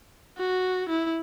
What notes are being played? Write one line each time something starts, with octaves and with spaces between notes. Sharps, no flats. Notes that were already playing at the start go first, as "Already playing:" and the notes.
F#4
E4